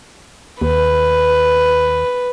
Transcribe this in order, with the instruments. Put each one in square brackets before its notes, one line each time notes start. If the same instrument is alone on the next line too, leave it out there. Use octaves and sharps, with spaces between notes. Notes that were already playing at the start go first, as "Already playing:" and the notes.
[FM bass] D#2 [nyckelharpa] B4